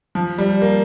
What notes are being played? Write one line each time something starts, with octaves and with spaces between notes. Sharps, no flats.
F3
G3
A#3